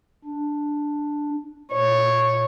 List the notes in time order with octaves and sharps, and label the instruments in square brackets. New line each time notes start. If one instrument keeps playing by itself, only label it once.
[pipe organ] D4
[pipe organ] A#2 [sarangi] C#5